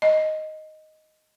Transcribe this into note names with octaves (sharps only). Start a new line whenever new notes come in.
D#5